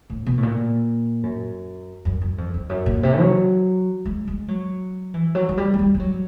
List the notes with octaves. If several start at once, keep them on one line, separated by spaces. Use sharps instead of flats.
A2
B2
A2
A#2
F#2
F#2
F#2
F2
F2
F#2
A#2
C3
F#3
G#3
G#3
F#3
E3
F#3
F#3
G3
G#3
G3
G3
F#3